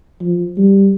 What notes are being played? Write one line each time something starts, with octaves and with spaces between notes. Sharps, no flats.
F3
G3